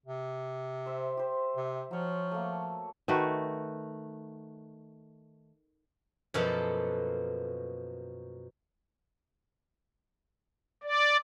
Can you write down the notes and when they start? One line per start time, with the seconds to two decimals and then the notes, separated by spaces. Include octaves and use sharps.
0.06 C3
0.86 C5 E5
1.17 G4 C5
1.56 C3
1.91 F3 F#3 C#5
2.31 A3 A#3
3.08 D#3 A3 F#4 B4
6.34 F#2 B2 F3 A#3 A4
10.83 D5